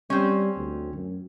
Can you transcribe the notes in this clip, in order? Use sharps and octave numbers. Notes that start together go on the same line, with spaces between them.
G3 C4 C#4
D2
F#2